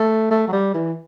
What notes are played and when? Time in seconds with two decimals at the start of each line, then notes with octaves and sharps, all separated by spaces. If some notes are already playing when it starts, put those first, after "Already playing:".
Already playing: A3
0.31 A3
0.48 F#3
0.53 G3
0.74 E3